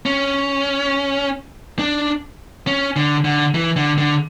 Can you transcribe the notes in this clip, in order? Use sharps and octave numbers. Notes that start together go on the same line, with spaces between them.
C#4
D4
C#4
D3
D3
E3
D3
D3